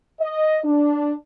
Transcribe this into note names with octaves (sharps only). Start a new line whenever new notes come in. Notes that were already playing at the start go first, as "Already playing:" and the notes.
D#5
D4